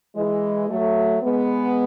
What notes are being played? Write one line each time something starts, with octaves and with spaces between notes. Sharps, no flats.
E3 G#3
F#3 A3
G#3 B3